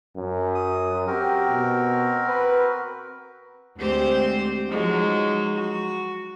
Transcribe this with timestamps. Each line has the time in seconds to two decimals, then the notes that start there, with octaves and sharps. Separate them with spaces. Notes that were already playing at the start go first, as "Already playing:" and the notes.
0.15 F#2
0.55 D#6
1.07 C4 F#4 G4 A#4
1.48 B2
2.27 B4
3.77 D2 G#3 C4 G4 C5 C6
4.69 F3 F#3 G#3 D#4 F#4
5.55 F#4